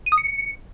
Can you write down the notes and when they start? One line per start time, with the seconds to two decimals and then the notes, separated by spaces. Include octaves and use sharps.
0.06 D#7
0.12 D#6
0.18 C#7